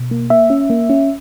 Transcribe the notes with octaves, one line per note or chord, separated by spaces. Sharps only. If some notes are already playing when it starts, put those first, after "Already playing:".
Already playing: B2
A#3
A#3 E5
C#4
A#3
C#4